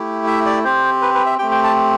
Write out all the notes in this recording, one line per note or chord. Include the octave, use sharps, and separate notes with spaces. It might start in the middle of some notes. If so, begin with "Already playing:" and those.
Already playing: A3 E4 G4
E5
D5
C4 G4 C5
B4
B4
E5
A3 C4 G4 G5
G5
A5